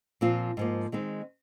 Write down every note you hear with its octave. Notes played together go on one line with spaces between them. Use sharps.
A#2 F3 C4 F4
G#2 F3 A#3
D#3 G#3 C4 D#4